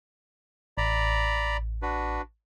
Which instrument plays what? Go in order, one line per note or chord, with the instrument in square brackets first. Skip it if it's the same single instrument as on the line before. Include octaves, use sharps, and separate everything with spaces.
[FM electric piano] A1 [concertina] D5 A#5 B5
[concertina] D4 F#4 B4